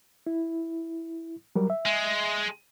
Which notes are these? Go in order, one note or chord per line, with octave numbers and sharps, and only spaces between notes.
E4
F#3 G3 A#4
E5
G#3